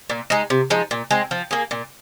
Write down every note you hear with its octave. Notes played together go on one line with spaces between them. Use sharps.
A#2
G#3 D#4
C3
F3 G#3 D#4
A#2
G#3 C4
F3
A#3 G#4
A#2